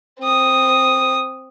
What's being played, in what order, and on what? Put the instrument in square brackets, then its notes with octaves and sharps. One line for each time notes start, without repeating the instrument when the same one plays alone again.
[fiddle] C4 D#6